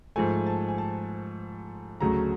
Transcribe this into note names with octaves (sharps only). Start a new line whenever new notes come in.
G#2 F3 A3 G#5
A5
G#5
A5
D2 C#3 F#3 A3 A#5